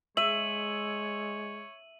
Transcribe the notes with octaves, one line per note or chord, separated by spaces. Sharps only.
G#3 C#5 E5 D#7 F#7